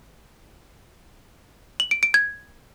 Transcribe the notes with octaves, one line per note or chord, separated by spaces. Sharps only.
F#7
D7
D7
G#6